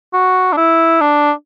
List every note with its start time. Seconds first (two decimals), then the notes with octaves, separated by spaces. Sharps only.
0.14 F#4
0.53 D4
0.57 E4
1.01 D4